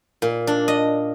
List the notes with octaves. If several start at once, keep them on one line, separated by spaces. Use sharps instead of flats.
A#2
D4
D#5